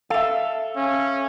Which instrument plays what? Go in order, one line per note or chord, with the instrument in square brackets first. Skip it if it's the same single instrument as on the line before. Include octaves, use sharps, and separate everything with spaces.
[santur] A4 E5 [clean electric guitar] F5
[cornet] C#4